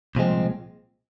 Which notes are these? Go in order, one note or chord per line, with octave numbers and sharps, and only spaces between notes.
C2 A#2 F3 G#3 C4